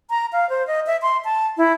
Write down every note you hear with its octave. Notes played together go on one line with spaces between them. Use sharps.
A#5
F5
C5
D#5
E5
C6
A5
E4